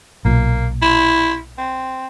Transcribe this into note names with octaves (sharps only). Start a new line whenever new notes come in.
B1 A#2 A#3
E4
C4